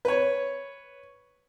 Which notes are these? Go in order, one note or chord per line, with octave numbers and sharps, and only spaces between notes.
B4 C#5